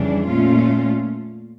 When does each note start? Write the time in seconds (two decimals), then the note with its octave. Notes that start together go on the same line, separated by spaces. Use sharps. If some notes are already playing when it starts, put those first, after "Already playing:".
Already playing: F2 C#3 E3 G3 D4
0.27 A#2 A3 C#4 F4